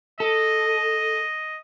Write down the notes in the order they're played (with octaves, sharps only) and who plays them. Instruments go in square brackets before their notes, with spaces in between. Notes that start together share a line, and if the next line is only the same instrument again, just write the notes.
[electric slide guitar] A4 [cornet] D#5